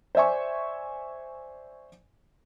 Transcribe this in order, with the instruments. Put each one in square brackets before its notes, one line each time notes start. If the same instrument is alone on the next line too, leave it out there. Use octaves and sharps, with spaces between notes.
[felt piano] C5 D5 E5 G#5 C#6